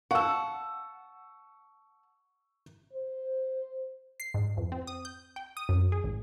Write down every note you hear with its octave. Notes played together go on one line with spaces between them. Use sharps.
F5 F#5 A5 C#6 E6
C5
C7
G#2
F2
C4
D#6
G6
G5
D#6
F#2
G#4
A1